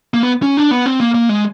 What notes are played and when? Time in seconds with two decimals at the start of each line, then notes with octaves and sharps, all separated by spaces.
0.14 A#3
0.23 B3
0.42 C#4
0.57 D4
0.71 B3
0.86 C4
1.00 A#3
1.14 A#3
1.29 G#3